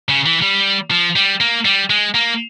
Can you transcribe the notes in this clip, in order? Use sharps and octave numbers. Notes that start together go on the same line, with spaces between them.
C#3
E3
G3
F3
G3
A#3
G3
G#3
A#3